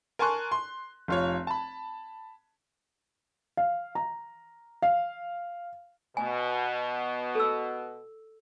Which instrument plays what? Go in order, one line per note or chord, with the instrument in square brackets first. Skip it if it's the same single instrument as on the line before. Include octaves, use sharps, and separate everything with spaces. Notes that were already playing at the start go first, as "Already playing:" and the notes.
[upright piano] A#4 G#5 A5 C6 C#6 F#6
C6
F1 F4 C#5
A5 B5
[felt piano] F5
A#5
F5
[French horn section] B2 [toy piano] G#5
[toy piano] A4 E6